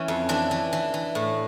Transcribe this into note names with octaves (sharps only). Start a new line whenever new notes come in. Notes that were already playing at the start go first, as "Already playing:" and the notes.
Already playing: E3 C#4
F2
E3 D4
E3
E3
E3
A2